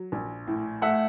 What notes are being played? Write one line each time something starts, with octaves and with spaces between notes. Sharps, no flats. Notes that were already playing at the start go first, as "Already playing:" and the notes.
Already playing: F#3
A#1
A2
A3 E5 F#5